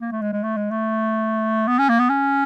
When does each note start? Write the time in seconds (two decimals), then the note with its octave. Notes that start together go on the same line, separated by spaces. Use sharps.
0.01 A#3
0.12 A3
0.22 G#3
0.32 G#3
0.43 A3
0.57 G#3
0.71 A3
1.68 B3
1.79 C#4
1.89 A#3
1.99 B3
2.09 C#4